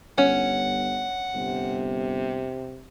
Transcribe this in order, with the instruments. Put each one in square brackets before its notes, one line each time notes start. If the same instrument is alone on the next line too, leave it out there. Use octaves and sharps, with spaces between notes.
[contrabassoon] G1 [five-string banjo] C#4 [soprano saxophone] F#5
[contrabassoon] G1 [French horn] C3